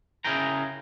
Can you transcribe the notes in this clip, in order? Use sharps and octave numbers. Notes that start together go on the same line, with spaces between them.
C#3 E4 G#4 A#4 G5 A#5